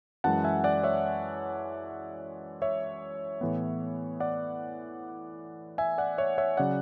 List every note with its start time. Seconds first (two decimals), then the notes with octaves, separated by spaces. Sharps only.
0.24 F#2 E3 G#3 F#5 A5
0.44 E5 G#5
0.64 D5 F#5
0.84 C#5 E5
2.62 C#5 E5
3.41 A2 E3 B3
4.20 D5 F#5
5.78 E5 G#5
5.98 D5 F#5
6.18 C#5 E5
6.38 C#5 E5
6.57 C#3 F#3 D5 F#5